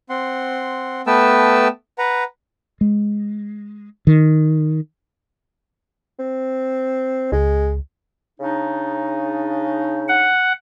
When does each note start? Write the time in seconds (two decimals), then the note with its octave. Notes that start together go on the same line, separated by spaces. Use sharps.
0.10 C4 F#5 C6
1.07 A3 B3 B4 G5 A5 E6
1.98 B4 F#5 A#5
2.81 G#3
4.07 D#3
6.19 C4
7.32 C#2 G#3
8.40 C#3 D4 D#4
10.08 F#5